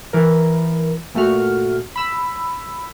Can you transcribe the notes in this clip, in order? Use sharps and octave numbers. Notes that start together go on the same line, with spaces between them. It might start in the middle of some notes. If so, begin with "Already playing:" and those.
E3 A#4
A#2 A3 F#4 F6
B5 E6